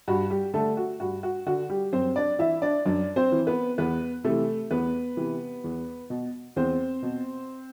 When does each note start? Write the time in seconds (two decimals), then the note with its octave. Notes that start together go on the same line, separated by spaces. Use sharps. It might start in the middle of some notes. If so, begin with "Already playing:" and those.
0.08 G2 F#4
0.30 G3 G4
0.54 D3 A3 A4
0.77 F#4
1.00 G2 F#4
1.23 F#4
1.46 D3 F#4
1.69 G3 G4
1.93 F#2 C4 C5
2.16 D4 D5
2.39 E3 E4 E5
2.62 D4 D5
2.86 F#2 D4 D5
3.16 C4 C5
3.32 E3
3.47 B3 B4
3.78 E2 B3 B4
4.24 C3 E3 A3 A4
4.71 E2 B3 B4
5.17 C3 E3
5.64 E2
6.10 B2
6.56 E2 C4 C5
7.03 B2